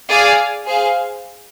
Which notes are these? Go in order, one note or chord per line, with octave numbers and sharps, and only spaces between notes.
G#4 D5 F5 G#5
G#4 C5 F5